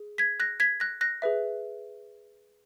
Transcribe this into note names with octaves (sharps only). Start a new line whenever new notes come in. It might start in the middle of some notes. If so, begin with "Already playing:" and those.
Already playing: G#4
G#6 B6
F#6 A#6
G#6 B6
F#6 A#6
F#6 A#6
G#4 B4 E5